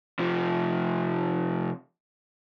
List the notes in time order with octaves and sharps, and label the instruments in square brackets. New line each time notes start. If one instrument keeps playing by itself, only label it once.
[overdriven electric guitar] C3 F3